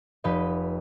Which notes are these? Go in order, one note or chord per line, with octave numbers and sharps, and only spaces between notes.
F1 G4 B4 D#5